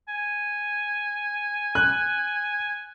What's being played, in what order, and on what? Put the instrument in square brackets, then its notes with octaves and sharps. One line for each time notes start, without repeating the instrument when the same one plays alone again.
[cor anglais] G#5
[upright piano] F#6